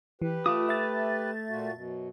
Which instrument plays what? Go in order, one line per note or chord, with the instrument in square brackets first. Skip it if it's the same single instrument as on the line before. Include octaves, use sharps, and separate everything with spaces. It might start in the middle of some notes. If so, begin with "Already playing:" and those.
[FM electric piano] E3 [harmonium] G4 B4
[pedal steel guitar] A3 D6 D#6 [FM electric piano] F4
[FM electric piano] E5 A6
[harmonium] A#2 F4 F#4
F#2 B2